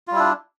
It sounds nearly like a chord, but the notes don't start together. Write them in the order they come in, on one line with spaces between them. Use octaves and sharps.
F4 G3 E4 D4